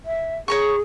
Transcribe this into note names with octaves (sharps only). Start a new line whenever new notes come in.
E5
G#4 C#5 A#5 C#6